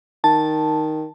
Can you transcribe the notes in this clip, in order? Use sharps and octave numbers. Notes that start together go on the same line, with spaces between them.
D#3 A5